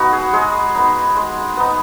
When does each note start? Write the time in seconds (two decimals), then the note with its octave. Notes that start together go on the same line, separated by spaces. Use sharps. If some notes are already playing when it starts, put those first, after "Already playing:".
Already playing: B3 D#4 F#4
0.12 G#4
0.33 G#3 G#4
0.75 B3 D#4
1.16 G#3
1.57 B3 D#4